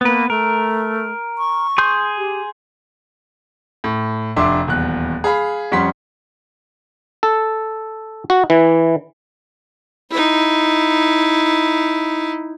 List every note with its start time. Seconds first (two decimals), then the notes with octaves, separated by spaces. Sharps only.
0.01 A#3 B3 B4
0.30 A3 A#4
1.38 C#6
1.78 G#4 C6 G6
2.18 G4
3.84 A2
4.36 F1 D4 E5 C6 D6
4.67 D#1 E2 F#6
5.24 G#4 F5 B5
5.72 F2 G3 C#4 F#5 C6 B6
7.23 A4
8.30 F#4
8.50 E3
10.11 D#4 E4